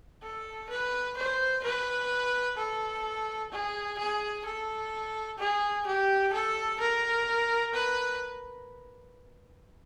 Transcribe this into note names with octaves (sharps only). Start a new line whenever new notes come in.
A4
B4
C5
B4
A4
G#4
G#4
A4
G#4
G4
A4
A#4
B4